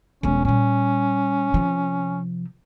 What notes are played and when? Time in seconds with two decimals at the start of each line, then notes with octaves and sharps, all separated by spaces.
0.23 E1 F3 C#4
0.45 A#2 G3 C#4
1.54 C3 F3